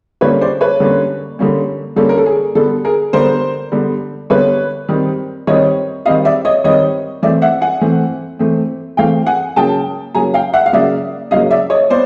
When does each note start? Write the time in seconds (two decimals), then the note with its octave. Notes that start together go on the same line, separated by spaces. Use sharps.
0.21 D3 G3 A#3 C#4 B4 C#5
0.41 C5 D5
0.61 B4 C#5
0.80 D3 G3 A#3 C#4
1.39 D3 G3 A#3 C#4
1.96 D3 G3 A#3 C#4 A4
2.09 A#4
2.18 A4
2.26 G#4
2.55 D3 G3 B3 A4
2.85 G#4 A#4
3.13 D3 G3 B3 A#4 C5
3.72 D3 G3 B3
4.30 D3 G3 B3 B4 C#5
4.89 D#3 G3 C4
5.47 D#3 G3 C4 C#5 D#5
6.06 D#3 G3 C4 D#5 F5
6.25 D5 E5
6.45 C#5 D#5
6.64 D#3 G3 C4 C#5 D#5
7.22 E3 A3 C4 D5 E5
7.42 E5 F#5
7.61 F#5 G#5
7.81 E3 A3 C4
8.39 E3 A3 C4
8.97 E3 A3 C4 F5 G5
9.27 F#5 G#5
9.56 C#3 F#3 A#3 G5 A5
10.15 C#3 F#3 A#3 G#5 A#5
10.34 F5 G5
10.53 E5 F#5
10.66 F5
10.73 C#3 F#3 A#3 D5 E5
11.31 C#3 F#3 A#3 D#5 F5
11.51 D5 E5
11.70 C#5 D#5
11.90 B3 C5 D5